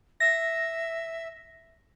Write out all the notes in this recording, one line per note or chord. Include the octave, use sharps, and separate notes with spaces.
E5 A#6